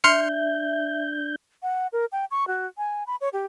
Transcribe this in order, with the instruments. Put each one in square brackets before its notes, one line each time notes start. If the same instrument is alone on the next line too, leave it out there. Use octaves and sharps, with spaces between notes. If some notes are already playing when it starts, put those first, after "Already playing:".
[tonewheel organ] D4 G6 [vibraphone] E5 [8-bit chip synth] C6 F6 C#7
[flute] F#5
A#4
G5
C#6
F#4
G#5
B5
C#5
G4